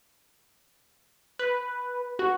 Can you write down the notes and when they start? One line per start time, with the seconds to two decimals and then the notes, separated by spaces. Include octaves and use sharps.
1.39 B4
2.19 F#4